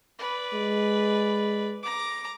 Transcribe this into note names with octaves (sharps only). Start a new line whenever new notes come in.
B4 D5
G#3
A#5 D6